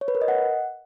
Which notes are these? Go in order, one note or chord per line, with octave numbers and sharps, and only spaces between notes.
C#5
B4
A#4
D#5
F#5